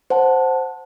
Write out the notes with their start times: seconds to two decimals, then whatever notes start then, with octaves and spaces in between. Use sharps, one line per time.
0.10 C5 F#5 A5